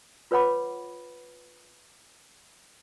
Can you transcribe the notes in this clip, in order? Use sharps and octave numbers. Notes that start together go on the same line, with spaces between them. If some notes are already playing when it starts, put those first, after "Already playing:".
F4 B4 C#5 F#5 B5 D6